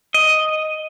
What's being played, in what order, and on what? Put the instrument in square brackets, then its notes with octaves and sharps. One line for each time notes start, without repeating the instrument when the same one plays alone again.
[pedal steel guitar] D#5